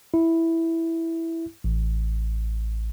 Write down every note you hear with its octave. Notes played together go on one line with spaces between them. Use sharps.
E4
A1